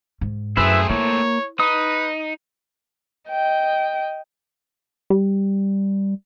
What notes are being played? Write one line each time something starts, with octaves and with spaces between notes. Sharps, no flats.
G#2
F#2 A3 C4 E4 G#4 B4 E5
A#3 E4 C#5
D#4 B4 D#6
D#5 G5
G3